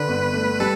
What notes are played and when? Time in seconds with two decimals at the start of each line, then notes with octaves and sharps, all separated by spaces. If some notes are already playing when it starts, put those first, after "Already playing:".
Already playing: D3 B4
0.08 G1
0.34 A3
0.60 G3 A4